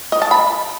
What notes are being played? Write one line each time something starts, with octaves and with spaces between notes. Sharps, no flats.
D#5
A5
B5